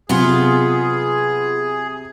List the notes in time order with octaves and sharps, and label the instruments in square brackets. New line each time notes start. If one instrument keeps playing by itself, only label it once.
[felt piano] C3 F#3 [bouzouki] B3 F4 [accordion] G#4